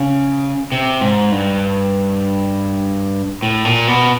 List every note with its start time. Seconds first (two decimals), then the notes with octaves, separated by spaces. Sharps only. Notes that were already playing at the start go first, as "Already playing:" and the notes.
Already playing: C#3
0.72 C3
1.01 G#2
1.31 G2
3.43 A2
3.65 A#2
3.87 B2